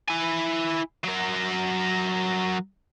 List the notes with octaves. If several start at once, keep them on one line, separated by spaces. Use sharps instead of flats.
E4 G#5
F#3 A#4